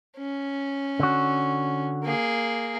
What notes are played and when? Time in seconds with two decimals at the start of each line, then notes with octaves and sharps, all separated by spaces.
0.17 C#4
1.00 D3 F#4
2.04 A#3 G#4